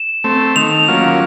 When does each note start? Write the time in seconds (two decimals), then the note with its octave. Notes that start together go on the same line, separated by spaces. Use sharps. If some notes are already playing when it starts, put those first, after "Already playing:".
Already playing: E7
0.24 A3 C4
0.56 D#3 F7
0.88 F#3 A#3 C#4 F4